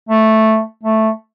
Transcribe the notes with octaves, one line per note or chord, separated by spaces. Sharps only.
A3
A3